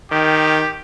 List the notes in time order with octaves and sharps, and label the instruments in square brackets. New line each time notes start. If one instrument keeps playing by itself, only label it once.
[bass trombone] D#3 [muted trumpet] G4